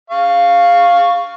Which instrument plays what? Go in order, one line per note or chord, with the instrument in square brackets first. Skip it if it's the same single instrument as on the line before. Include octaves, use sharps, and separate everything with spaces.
[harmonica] F5 C#6